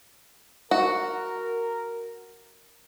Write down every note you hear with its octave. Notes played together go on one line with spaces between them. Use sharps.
F#4 A#4